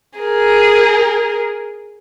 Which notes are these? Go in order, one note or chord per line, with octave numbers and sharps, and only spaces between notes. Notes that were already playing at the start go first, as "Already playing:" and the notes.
G#4 A#4